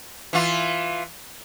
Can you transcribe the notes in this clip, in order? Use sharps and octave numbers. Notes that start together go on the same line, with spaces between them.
E3 F4